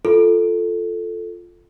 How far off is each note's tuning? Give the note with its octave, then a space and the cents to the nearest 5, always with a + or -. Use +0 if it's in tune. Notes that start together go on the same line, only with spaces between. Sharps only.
F4 +0 A4 +0